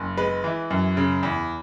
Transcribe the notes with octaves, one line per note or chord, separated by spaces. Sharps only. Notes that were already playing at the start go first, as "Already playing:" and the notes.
Already playing: F#1
G#3 B4
E3
F#2
C#3
E2